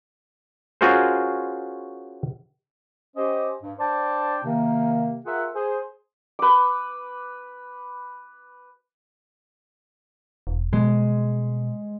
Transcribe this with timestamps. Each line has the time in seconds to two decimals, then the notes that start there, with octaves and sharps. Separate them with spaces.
0.81 C#4 F4 F#4 G#4 A#4 C5
3.17 C#4 G4 C5 D#5
3.62 G2
3.79 D4 C5 D5 G5 A5
4.44 C3 D#3 A#3
5.26 F4 G#4 A#4 E5 F#5
5.55 G#4 C5
6.39 B4 D6
10.47 E1
10.73 B2 G#3